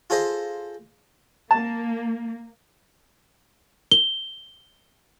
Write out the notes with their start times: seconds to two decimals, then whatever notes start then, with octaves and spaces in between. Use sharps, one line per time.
0.10 F4 G#4 A4 C5 D#5
1.51 A#3 A5
3.91 G7